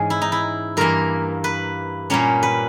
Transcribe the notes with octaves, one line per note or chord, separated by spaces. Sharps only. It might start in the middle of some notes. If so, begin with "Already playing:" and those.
Already playing: G#2 E3 G#3 C#4 G#4
E4
D#4
E4
G2 E3 A#3 A#4
B4
A#2 G3 A#3 C#4 C#5
B4